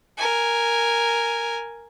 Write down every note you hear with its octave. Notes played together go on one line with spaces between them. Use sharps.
A#4 G#5